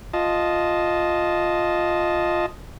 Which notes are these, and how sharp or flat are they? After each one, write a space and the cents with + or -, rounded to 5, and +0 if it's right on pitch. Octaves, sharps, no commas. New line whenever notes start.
F4 +0 D#5 +0 A5 -15